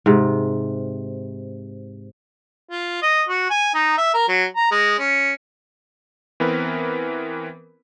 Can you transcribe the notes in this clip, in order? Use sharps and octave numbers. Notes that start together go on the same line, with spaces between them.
G#2 C3
F4
D#5
F#4
G#5
D#4
E5
A#4
F#3
A#5
G#3
C#4
E3 B3 C4 A#4 B4